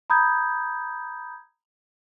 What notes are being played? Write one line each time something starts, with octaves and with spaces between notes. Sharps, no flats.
A#5 B5 D#6 G6 G#6